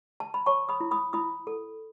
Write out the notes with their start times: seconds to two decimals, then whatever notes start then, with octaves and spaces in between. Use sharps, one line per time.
0.20 A5
0.34 B5
0.46 C#5 A5 C#6
0.69 B5 D#6
0.81 E4
0.91 B5 D#6
1.13 E4 B5 D#6
1.47 A4